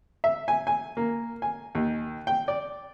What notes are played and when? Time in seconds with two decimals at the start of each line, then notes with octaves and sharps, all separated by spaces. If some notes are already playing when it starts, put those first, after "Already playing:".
0.24 E5
0.48 G#5
0.67 G#5
0.97 A#3
1.42 G#5
1.75 D#2
2.27 G5
2.48 D5